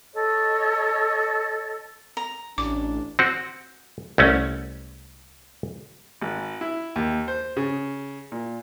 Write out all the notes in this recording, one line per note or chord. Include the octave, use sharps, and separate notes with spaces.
A4 C#5 D#5
A#5
A1 D4 D6
C4 F#4
C2 A3 C#4
G#1
E4
D#2
C5
C#3
A#2